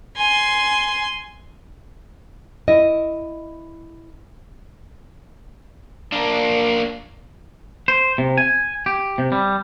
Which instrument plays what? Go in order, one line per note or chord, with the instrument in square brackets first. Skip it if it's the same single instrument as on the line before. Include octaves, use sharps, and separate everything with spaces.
[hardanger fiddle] G#5 C6
[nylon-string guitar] E4 D#5
[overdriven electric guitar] A#3 D4
[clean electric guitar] C5
C3
G#5
G4
C3
G3